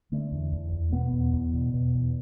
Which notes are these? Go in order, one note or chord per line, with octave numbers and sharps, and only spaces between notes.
D3 A3
E2
E2
E2
B2 B3
E2
E2
B2
B2
E2